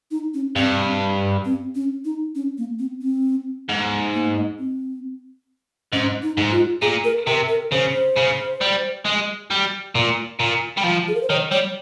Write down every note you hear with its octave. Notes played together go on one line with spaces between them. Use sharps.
D#4
C#4
G2 C4
C4
C#4
D#4
C#4
A#3
C4
C4
G#2
A#3
C4
G#2 C#4
D#4
G#2
F4
A#2 G#4
A#4
C3 A#4
A#4
C#3 C5
C#3
G3
G#3
G3
A#2
A#2
G3
F3
G#4
A#4
C5
D#3 C#5
G3 C#5